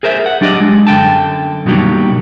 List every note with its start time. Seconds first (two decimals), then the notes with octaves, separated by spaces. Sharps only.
0.03 G#4 A#4 C5 E5
0.26 F#5
0.41 F#3 D4 G4 D5 D#5
0.60 G#3 D4
0.87 F#2 D3 G5 A5
1.66 B2 D3 D#3 F#3 G3 A#3